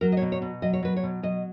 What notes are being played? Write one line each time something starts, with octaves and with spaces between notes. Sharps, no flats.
F#3 A#4
D#5
C#5
B2
C#5
B2
F#3 D#5
C#5
F#3 B4
C#5
B2
F#3 D#5